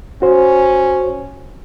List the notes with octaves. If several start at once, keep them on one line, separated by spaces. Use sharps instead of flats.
C#4 F#4 C5